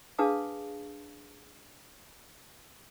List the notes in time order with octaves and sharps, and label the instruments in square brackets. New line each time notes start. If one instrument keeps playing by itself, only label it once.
[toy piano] D4 G#4 B4 F5 A5 D#6